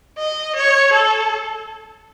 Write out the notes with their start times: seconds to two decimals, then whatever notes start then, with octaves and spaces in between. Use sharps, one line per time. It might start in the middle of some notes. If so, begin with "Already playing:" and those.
0.18 D#5
0.56 C#5
0.93 A4